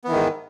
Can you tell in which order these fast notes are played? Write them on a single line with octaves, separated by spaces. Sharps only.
B3 E3 D#3 G#2